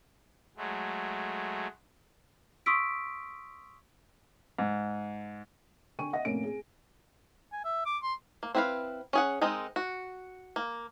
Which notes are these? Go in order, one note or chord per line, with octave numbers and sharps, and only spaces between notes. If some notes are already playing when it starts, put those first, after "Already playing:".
F#3 G#3 A3
C6 C#6 D#6 E6 B6 D7
G#2
D3 G5 G#5 C#6 D#7
D#5 E5 F#5 A#6
F1 A2 A#3 C#4 D7
G#4
G#5
E5
D6
C6
A#3
C4 E4 B4 C5 F5
C#4 G#4 F#5
G#3 C4 D#4 A#4
F#4
A#3